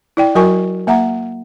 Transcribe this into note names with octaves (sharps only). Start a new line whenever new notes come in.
E4 D5 G5
F#3 F#4 A#4 G#5 C#6
A#3 E5 F#5 A#5